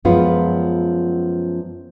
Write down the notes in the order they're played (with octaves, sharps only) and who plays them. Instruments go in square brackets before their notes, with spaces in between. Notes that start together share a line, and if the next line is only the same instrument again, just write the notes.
[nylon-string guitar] F#2 F3 G#3 B3 F4